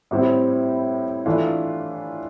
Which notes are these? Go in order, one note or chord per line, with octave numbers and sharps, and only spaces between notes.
A2 G3 C4 E4
E3 A3 D4 F4